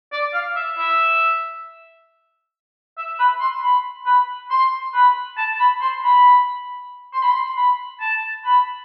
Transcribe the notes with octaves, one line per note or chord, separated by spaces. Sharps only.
D5
F5
E5
E5
E5
B5
C6
B5
B5
C6
B5
A5
B5
C6
B5
C6
B5
C6
B5
A5
B5